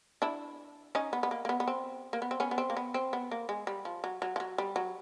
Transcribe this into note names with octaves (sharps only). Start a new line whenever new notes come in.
D4 E4
C#4 D#4
B3
B3
A#3
A#3
B3
B3
C4
A#3
B3
C4
B3 C#4
B3
C4
A#3
B3
C4
B3
A#3
G#3
G3
F3
F#3
F#3
F3
F#3
G3
F#3